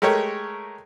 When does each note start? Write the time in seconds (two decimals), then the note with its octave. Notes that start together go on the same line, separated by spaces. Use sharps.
0.02 G#3 A3 G4 A#4 C#5